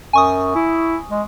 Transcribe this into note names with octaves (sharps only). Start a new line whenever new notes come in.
F#2 G#5 C#6 D#6
E4
G#3